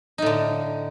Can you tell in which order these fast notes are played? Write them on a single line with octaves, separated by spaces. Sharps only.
D#4 A2 D3